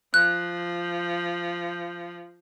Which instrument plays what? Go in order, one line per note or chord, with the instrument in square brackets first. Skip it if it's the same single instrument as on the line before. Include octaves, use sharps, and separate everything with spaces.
[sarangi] F3 [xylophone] F#6